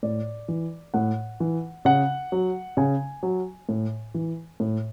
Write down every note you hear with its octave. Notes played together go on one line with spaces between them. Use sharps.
A2 D5
E3
A2 F#5
E3
C#3 F#5
F#3
C#3 G#5
F#3
A2
E3
A2